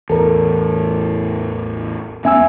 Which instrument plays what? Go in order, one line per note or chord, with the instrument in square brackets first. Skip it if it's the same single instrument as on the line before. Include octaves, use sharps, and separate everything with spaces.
[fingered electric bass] A1 E2 [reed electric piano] A4 A#4
[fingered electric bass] E1 B3 C#4 [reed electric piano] E5 G#5 E6